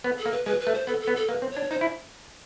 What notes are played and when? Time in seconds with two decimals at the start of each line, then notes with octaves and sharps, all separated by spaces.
0.04 B3
0.19 A4
0.26 A#3
0.32 B4
0.46 G#3 B4
0.60 B4
0.67 A3
0.73 C5
0.87 B3 A4
1.01 A4
1.07 B3
1.16 A4
1.28 A#3 B4
1.42 C4
1.50 C#5
1.57 D4
1.71 D#4 C5
1.81 E4